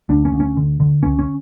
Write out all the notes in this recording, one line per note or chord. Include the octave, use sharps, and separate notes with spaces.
D2 D4
C#4
D2
C#4
D3
D3
C#2 C#4
C#4